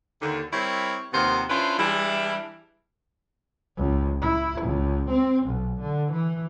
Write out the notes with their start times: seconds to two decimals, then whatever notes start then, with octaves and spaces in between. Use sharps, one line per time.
0.22 D#2 D3
0.53 G3 C4 E4 A#4 C#5
1.13 D#2 C3 D#3 F3 B3 C5
1.50 C#4 D4 E4 F4 B4 C5
1.79 E3 G3 G#3 D4 E4
3.77 C#2
4.21 E4
4.62 C#2
5.09 C4
5.46 B1
5.80 D3
6.12 E3